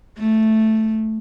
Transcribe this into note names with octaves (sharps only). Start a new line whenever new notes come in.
A3